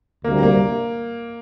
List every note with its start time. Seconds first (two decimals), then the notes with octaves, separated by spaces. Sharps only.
0.24 D2 C3 G3 A#3
0.43 A#3